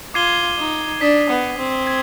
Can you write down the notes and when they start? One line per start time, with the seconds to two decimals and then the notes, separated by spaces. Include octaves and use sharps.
0.14 F4 D6 G#6 C7 D#7 G7
0.58 D#4
1.01 D4 D#6 G#6 B6
1.29 B3
1.58 C4
1.87 G#6